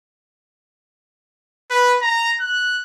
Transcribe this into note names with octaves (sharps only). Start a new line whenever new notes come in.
B4
A#5
F#6